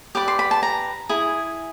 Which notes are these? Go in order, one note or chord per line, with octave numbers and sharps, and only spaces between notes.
G4 B4 D5 D6
C6
B5
A5
A#5
E4 G#4